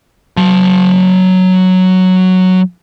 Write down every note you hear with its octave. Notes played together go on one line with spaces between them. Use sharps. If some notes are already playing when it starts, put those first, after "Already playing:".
F#3 A5